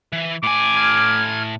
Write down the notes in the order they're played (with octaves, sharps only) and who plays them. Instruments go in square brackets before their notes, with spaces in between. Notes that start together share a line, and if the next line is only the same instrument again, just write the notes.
[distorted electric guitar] E3
[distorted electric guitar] A2 G#5 [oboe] D6
[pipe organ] F6 G#6